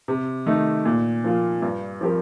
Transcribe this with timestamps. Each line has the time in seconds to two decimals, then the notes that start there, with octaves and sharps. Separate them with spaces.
0.08 C3
0.46 D#3 A3 D#4
0.85 A#2
1.24 F3 A#3 F4
1.62 G2
2.01 F3 C4 G4 A#4